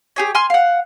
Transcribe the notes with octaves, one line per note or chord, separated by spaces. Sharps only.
G4 G#4 C#5
G#5 C6 F6
F5 F#5